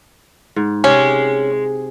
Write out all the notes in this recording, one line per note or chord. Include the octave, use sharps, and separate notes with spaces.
G#2
C3 G#3 C#4 G4